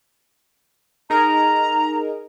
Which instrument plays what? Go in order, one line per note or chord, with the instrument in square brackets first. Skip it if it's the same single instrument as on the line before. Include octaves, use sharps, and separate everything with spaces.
[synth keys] D#4 G#4 A#4 [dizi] A#5